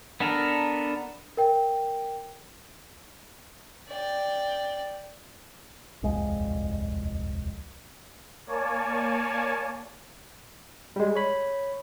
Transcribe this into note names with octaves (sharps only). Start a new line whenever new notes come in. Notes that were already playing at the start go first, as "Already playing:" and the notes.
B3 D4 A4 A#4
A#4 G5
D5 G5
D#1 C2 F2 G#3
A#3 C#5 D5 G#5 A5
G3 G#3
C#5 B5